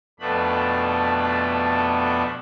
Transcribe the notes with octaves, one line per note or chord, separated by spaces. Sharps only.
F2 B2 A3 B3 D4 B5